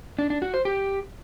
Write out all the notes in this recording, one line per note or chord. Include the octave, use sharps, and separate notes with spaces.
D4
D4
F#4
C5
G4